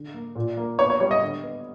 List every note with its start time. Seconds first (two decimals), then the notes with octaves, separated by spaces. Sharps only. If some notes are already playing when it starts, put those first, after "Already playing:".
Already playing: D3
0.14 A#3
0.36 A#2
0.57 A#3
0.78 B3 C#5
0.90 C#5
1.00 G3 C#5
1.11 D#5
1.22 D3
1.43 B3